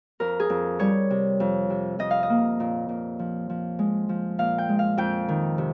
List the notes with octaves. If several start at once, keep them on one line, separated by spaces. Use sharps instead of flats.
F2 A#4
G#4
F2
G3 C#5
C3
F2
C3
F2 D#5
F5
D#5
A#3
A#2
A#2
F3
F3
G#3
F3
A#2 F5
G5
G#3
F5
F2 G5
D#3
C3